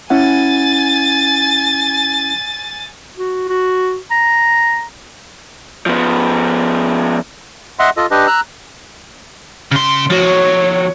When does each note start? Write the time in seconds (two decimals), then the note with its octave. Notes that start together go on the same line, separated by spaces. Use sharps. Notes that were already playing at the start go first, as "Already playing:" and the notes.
0.10 C#4 E4 F#5 G#5 A6
3.17 F#4
3.49 F#4
4.11 A#5
5.86 F3 B3
7.79 D#5 E5 F#5 C6
7.97 F4 A4 D#5
8.11 D4 G4 B4 D#5
8.27 A#5 E6 F#6
9.71 C#3 C6
10.10 F3 F#4 C#5